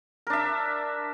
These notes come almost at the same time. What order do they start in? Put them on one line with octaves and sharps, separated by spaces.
A#4 D4 E5